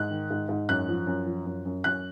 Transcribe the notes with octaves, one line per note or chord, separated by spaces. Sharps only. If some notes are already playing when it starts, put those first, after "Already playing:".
Already playing: G#2 F#6
D#3
G#2
G#2
F#2 F#6
F3
F#2
F3
F#2
F#2
F#2 F#6